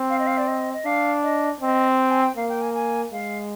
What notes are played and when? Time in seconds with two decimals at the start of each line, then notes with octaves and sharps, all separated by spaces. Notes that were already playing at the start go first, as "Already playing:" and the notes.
Already playing: C4
0.10 F5
0.19 D#5
0.27 F5
0.38 D5
0.48 D#5
0.74 D#5
0.85 D4 F5
1.23 D#5
1.61 C4 D#5
1.98 G5
2.11 G#5
2.23 G5
2.37 A#3 F5
2.49 G5
2.61 G#5
2.75 G#5
3.12 G#3 F5